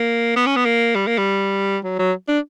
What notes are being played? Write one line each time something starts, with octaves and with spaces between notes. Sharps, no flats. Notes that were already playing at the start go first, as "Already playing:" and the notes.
Already playing: A#3
B3
C#4
B3
A#3
G3
A#3
G3
F#3
F#3
D4